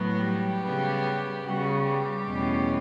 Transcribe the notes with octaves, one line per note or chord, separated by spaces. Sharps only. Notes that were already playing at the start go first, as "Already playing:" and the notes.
Already playing: A2 F#3 B3
G3 G4
C#3 G3 B3
C#3 G3 B3 F#4
G3 G4
E2 B2 A3 C#4